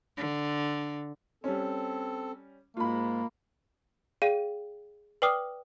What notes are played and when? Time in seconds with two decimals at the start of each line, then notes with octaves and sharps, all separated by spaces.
0.17 D3
1.44 G3 C4 C#4 A4
2.77 G#2 G#3 A#3 F4 B5
4.22 G#4 D5 F5 G5 D#7
5.22 B4 D5 G5 D6 D#6 F6